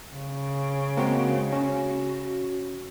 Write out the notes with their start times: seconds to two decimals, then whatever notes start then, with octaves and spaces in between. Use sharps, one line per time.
0.15 C#3
0.97 G#3 A#3 C4 F#4
1.53 C#4 F#4